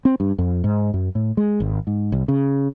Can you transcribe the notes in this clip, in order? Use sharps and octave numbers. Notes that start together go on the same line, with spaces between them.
C4
G2
F2
G#2
F#2
A2
G#3
G#1
G#2
C2
C#3